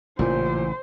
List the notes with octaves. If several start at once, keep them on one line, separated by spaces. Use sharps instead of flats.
A1 A#2 C#3 E3 C5